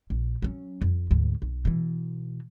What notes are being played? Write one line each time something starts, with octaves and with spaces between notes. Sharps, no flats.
A#1
F#3 C#4
F2
D2 G#2
B1
B2 E3